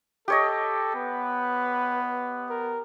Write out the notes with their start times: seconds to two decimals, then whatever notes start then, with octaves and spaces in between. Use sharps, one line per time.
0.28 G4 A4 C#5 D#5
0.95 B3 B4
2.50 A#4